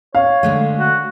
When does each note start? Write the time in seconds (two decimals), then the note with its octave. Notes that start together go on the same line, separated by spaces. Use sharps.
0.15 C#5 F5
0.43 D3 G#3 A3
0.79 F#4